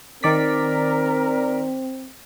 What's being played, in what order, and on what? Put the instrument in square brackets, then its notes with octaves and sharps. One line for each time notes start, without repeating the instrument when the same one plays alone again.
[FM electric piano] D#3 D5 B6 [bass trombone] C4 [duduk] A#4